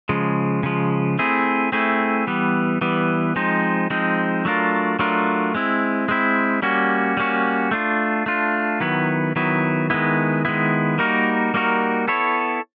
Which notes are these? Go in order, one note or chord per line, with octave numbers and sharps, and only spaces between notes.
C#3 F3 G#3
C#3 F3 G#3
A3 C4 E4 G#4
A3 C4 E4 G#4
E3 G3 B3
E3 G3 B3
F3 G#3 C4 D#4
F3 G#3 C4 D#4
F#3 A3 D4 F4 A#4
F#3 A3 D4 F4 A#4
G#3 C4 E4
G#3 C4 E4
G3 A#3 C#4 F#4
G3 A#3 C#4 F#4
A3 D4 F4
A3 D4 F4
D#3 F#3 B3 E4
D#3 F#3 B3 E4
D#3 G#3 B3 E4
D#3 G#3 B3 E4
G3 A#3 D#4 F#4 A#4
G3 A#3 D#4 F#4 A#4
B3 E4 A4 C#5